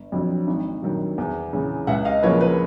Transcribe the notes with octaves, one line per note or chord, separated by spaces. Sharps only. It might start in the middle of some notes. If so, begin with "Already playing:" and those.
Already playing: G1
F2 D3 F#3
G#1
G2 D#3 F#3
E2
C#3 E3
C#2 E5 F#5
D#5 F5
C#3 F3 A#3 B4 C#5
B4